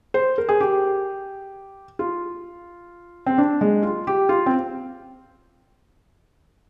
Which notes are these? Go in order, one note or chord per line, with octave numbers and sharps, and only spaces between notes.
C5
A#4
G#4
G4
F4
C4
D4
G#3
F4
G4
F4
C4